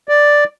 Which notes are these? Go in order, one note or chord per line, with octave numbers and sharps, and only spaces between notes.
D5